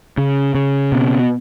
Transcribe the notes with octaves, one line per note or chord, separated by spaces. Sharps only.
C#3
C#3
B2